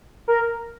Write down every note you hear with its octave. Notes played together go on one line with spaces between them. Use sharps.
A#4